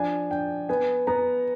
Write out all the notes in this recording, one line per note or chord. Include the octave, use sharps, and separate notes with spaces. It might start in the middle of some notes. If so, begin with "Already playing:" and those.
Already playing: F3 D4 G#5
D4 G5
B3 G#5
B3 A#5